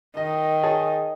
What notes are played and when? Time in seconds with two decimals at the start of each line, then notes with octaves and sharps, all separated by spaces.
0.17 D#3 D#5
0.63 G#4 C#5 A5